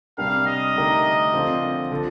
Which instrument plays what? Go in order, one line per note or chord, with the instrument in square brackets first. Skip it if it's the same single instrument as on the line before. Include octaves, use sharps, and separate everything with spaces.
[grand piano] C3 G3 D4 G4 A#4 [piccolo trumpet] F5
[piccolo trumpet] D#5
[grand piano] D3 A3 D#4 G4 A#4
D3 F3 C4 F4
D3 F3